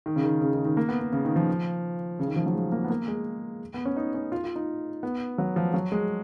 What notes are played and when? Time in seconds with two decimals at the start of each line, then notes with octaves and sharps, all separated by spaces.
0.06 D#3
0.16 C#3
0.24 D#3
0.41 C#3
0.54 D#3
0.65 D#3
0.77 A#3
0.89 B3
1.01 B3
1.13 C#3
1.25 D#3
1.36 F3
2.19 C#3
2.28 D#3
2.36 F3
2.46 F#3
2.54 G#3
2.72 A#3
2.84 B3
2.90 A#3
3.08 G#3
3.74 B3
3.85 C#4
3.97 D#4
4.14 C#4
4.32 F4
4.44 F4
4.56 D#4
5.03 B3
5.38 F#3
5.56 F3
5.74 F#3
5.92 G#3